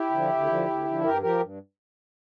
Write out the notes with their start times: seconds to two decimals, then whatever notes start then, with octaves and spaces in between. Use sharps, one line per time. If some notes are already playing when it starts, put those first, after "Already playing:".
Already playing: E4 G4
0.10 D3 F3
0.28 D2
0.47 D3 F3
0.66 D2
0.85 D3 F3
1.03 G2 G4 A#4
1.22 F3 G4 A#4
1.40 G2